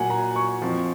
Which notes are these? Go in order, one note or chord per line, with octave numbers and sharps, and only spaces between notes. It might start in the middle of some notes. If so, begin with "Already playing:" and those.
Already playing: A#2 F#3 F#5 G#5
A#5
C#6
F2 F3